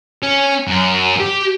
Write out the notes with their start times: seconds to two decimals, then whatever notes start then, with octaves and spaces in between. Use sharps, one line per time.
0.23 C#4
0.67 F#2
1.21 G4